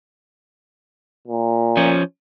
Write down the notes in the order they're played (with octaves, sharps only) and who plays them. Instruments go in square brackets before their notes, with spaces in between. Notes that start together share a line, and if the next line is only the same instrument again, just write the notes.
[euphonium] A#2
[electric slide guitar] F3 C#4